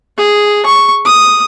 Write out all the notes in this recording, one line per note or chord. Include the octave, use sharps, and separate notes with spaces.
G#4
C#6
D#6